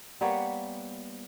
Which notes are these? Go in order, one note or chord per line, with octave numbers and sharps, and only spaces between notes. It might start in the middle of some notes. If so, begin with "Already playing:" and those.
G3 A#3 B3 C#5